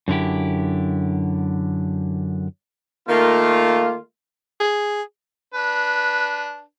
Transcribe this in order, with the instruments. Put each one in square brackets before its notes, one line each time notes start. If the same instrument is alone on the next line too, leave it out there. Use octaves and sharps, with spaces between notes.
[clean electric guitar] F#2 D3 E4 G4
[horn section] D#3 A3 A#3 F4
[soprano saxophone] G#4
[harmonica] D4 B4